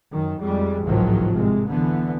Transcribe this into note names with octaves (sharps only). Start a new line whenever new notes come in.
F#2 D#3
F2 G3 G#3
G#1 C#2 A2 D#3 F3 F#3
C2 C3 G#3
D3 E3 B3